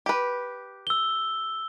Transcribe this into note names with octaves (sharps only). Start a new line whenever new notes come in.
G4 B4
E6 G7